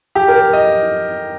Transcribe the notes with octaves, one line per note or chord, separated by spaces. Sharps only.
G4
A#4
D#5